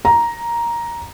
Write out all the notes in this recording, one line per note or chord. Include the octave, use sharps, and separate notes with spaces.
A#5